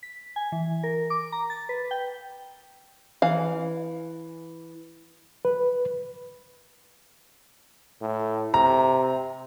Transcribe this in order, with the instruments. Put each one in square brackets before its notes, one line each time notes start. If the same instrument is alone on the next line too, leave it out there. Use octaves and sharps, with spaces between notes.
[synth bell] B6
G#5
E3
A#4
D6
A#5
A6
B4
G5
[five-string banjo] E3 F5
[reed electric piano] B4
[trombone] A2
[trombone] C3 [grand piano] A#5